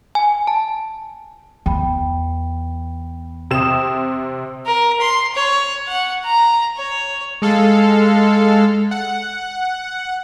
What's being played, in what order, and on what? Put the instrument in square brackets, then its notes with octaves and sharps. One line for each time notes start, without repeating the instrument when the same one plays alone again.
[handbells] G#5
A5
[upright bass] E2 [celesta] G5 B5
[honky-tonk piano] C3 E7 [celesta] G5 D#6
[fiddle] A#4
C6
C#5
F#5
A#5
C#5
[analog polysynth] G#3 A4 F5
F#5